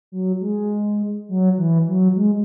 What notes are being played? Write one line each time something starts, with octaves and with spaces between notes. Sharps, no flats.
F#3
G#3
F#3
E3
F#3
G#3